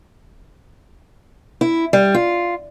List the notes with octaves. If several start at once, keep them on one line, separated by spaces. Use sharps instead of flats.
E4
G3
F4